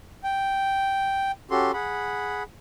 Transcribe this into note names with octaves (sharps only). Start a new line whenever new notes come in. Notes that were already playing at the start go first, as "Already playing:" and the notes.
G5
C#4 F#4 G4 A4 C6
G#4 F#5 B5